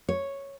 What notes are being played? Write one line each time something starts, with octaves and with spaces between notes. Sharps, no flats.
C#5